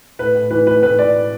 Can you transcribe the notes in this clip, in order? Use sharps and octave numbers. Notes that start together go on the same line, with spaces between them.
A2 B4
A2
E3 B4
E3 B4
A2 B4
A2 D5